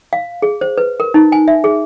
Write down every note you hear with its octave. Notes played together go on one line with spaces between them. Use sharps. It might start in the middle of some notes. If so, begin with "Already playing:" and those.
F5
G#4
C5
B4
A#4
D#4
G#5
E5
G#4